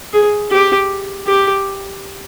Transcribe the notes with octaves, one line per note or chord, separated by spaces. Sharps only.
G#4
G4
G4